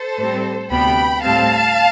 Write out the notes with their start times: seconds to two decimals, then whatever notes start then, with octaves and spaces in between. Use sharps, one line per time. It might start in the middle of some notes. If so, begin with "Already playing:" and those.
Already playing: A4 C5
0.19 A2 G3 C4
0.71 D2 C3 G3 B3 G5 B5
1.23 A2 G3 C4 F5 A5